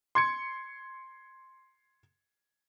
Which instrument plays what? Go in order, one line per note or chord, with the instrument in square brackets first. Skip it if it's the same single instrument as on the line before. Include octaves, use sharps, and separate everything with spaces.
[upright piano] C6 G#6 C#7